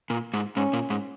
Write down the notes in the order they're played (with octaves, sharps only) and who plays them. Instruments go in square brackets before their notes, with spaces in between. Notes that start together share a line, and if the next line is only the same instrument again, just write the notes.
[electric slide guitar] A#2
G#2
[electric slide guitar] G#2 [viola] C#4
[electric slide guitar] A#2
G#2